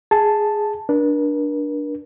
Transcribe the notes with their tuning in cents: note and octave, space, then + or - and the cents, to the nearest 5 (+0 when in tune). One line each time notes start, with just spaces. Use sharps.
G#4 +0 A5 +0
D4 +0 A#4 +45